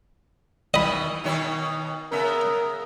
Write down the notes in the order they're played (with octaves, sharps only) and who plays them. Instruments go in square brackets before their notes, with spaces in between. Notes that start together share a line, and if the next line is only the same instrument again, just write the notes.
[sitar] B2 D#3 E3 [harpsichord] D#5 B5
[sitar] B2 D#3 C#5
[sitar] C#3 B3 E5 [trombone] A#4